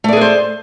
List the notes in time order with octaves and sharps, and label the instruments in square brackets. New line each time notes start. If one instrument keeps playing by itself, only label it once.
[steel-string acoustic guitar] A3
D5
G#4
B4
C5